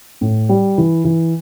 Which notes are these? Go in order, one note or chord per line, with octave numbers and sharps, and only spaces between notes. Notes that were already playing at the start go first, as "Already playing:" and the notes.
A2
G3
E3
E3